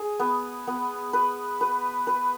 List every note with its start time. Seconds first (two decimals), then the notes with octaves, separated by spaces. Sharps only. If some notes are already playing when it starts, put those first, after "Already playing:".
Already playing: G#4
0.19 B3
0.67 B3
1.13 B4
1.61 B4
2.07 B4